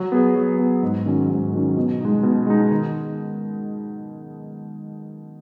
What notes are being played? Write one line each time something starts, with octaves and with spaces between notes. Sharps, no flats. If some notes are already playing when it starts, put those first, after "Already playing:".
Already playing: F#3
B3 G#4
F#3
B3 G#4
G#2
D#3 F#3 C#4
G#2
D#3 F#3 C#4
B2
G#3 D#4
B2
G#3 D#4
D#3